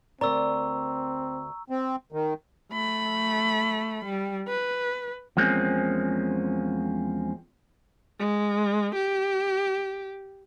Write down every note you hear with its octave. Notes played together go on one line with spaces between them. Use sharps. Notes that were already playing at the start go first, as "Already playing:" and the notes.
D2 C4 A#4 D5 A#5 C#6 E6
C4
D#3
A3 B5
G3
B4
E2 F3 G#3 A#3 C4 C#4
G#3
G4